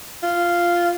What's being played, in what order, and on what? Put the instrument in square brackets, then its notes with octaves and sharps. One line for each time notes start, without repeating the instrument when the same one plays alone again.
[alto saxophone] F4